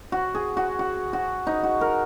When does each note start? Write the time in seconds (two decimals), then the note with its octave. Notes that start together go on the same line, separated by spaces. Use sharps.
0.12 F#4
0.35 G#4
0.57 F#4
0.79 F#4
1.13 F#4
1.47 D#4
1.63 F#4
1.81 A#4